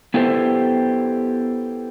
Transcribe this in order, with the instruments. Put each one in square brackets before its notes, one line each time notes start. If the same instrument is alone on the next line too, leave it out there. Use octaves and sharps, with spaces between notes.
[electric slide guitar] B3 E4 G4 A4 C5